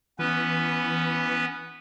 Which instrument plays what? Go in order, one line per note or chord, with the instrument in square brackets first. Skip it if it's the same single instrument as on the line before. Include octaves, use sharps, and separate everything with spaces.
[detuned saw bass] E3 [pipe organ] B3 C#4 B4